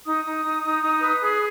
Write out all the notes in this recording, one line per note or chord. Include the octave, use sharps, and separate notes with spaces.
D#4 D#6
D#4
D#4
D#4
D#4
B4
G#4